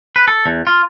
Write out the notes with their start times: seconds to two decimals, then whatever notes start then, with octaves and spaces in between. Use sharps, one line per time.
0.16 B4
0.28 A4
0.46 E2
0.67 F4